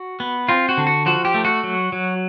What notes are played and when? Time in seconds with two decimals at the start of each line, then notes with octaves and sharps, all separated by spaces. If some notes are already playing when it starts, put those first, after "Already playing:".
Already playing: F#4
0.20 B3
0.48 C4 F4
0.69 F#4
0.77 D3
0.87 F#4
1.06 F3 F#4
1.25 G4
1.34 A3
1.45 F#4
1.63 F#3
1.92 F#3